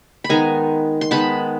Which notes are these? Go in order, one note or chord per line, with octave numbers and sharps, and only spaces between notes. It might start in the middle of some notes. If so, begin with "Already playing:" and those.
B5
D#3 G#3 B3 G#5 A#5
C6
D#3 G#3 B3 A5 B5